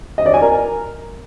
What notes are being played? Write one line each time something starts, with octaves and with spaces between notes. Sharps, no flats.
D#5
D5
G#5
A#4